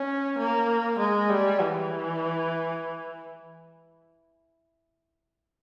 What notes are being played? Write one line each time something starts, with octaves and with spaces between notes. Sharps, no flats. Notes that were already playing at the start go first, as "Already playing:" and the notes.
Already playing: C#4
A#3
G#3
G3
E3